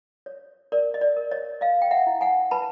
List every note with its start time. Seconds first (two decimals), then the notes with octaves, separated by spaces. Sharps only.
0.26 C#5
0.72 A#4 D5
0.94 D#5
1.01 D5
1.17 A#4
1.31 C#5 D#5
1.61 C#5 D#5 F5
1.82 G5
1.91 E5 F#5
2.07 E4
2.21 F#5 G#5
2.51 B4 A5 B5